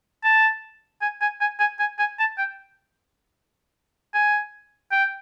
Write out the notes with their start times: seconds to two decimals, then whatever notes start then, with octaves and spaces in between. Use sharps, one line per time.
0.24 A5
1.02 G#5
1.21 G#5
1.41 G#5
1.60 G#5
1.79 G#5
1.99 G#5
2.19 A5
2.38 G5
4.14 G#5
4.92 G5